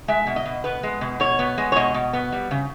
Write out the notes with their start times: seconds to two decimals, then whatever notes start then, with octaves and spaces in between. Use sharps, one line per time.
0.08 G#3 E5
0.27 B2
0.36 D#5
0.45 B2
0.64 B3 B4
0.83 G#3
1.01 B2
1.20 B2 C#5
1.39 B3
1.58 G#3
1.72 C#5
1.76 B2 D#5
1.94 B2
2.13 B3
2.32 G3
2.51 C#3